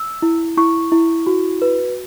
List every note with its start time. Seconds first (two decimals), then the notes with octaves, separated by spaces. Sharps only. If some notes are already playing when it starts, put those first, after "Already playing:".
Already playing: E6
0.22 E4
0.57 E4 C#6
0.92 E4
1.27 F#4
1.62 B4